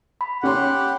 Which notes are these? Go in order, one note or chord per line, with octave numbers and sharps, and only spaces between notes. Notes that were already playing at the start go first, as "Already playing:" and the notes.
B5
C#4 G4 F#5 C6